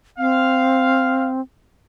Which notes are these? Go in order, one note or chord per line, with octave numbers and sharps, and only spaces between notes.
C4 F5